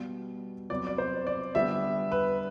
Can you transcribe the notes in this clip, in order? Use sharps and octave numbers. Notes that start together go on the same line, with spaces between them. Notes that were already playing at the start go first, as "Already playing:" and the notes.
Already playing: B2 G3 B3
C3 F#3 B3 D5
D5
C5
D5
D3 G3 B3 E5
B4